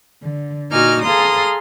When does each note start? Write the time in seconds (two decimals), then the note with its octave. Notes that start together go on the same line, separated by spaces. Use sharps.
0.22 D3
0.71 A#2 D#4 F#4 G#5 D6 F6
1.03 G#4 A4 F5 A#5 C6 D#6